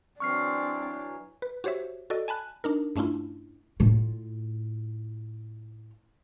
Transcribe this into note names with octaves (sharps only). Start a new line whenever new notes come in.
E3 F#3 C4 D4 C#6 F6 C7
B4
F#4 G4 C5 C#5 E5
F#4 A4 D5 D#5
G#5 A5 B5 F#6
D4 D#4 A#4
G2 A3 C#4 D4 E4 F4
A2 F4